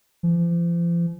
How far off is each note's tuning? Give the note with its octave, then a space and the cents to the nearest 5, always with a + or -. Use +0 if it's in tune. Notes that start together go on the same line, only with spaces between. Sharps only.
F3 -40